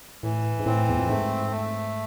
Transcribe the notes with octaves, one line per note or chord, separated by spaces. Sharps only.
A2 E3
G#2
A2 C4
E2
F2
G#2 A3
A3